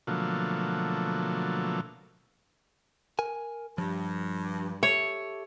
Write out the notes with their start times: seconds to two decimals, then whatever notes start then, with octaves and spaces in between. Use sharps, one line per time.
0.07 B2 D3 F3 F#3 A3 A#3
3.19 A#4 G#5
3.78 G2 F3
4.83 G4 A4 C#5 E5